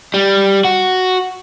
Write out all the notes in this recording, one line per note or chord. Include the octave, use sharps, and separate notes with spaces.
G3
F#4